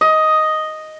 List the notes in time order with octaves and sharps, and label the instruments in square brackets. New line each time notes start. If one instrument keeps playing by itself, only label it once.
[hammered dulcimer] D#5